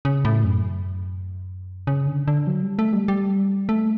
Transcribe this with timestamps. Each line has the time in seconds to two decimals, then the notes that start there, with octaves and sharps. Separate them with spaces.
0.05 C#3
0.25 A2
0.44 F#2
1.87 C#3
2.07 D3
2.28 D3
2.47 F#3
2.63 G3
2.79 A3
2.93 G3
3.08 G3
3.69 A3